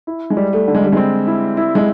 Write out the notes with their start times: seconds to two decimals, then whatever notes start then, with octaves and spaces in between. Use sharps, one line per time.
0.07 E4
0.30 G#3
0.37 G3
0.53 A3
0.68 D3
0.75 G#3
0.83 G3
0.93 G#3 C4
1.27 E4
1.57 E4
1.75 G#3